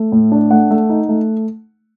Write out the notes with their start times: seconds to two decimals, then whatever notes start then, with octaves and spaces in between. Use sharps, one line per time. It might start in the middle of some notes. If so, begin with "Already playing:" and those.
Already playing: A3
0.12 A2
0.32 D4
0.51 A3 F#5
0.71 A3
0.89 D#4
1.09 A3